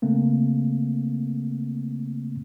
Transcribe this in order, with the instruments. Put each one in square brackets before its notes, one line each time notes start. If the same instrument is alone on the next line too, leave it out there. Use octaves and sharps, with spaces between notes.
[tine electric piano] C#3 A3 A#3 C4